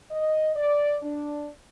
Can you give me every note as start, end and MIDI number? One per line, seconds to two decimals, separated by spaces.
0.11 0.51 75
0.56 0.97 74
1.03 1.50 62